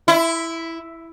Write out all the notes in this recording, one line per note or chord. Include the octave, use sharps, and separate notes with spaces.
E4